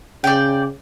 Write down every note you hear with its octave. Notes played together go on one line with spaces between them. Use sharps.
C#3 D5 G5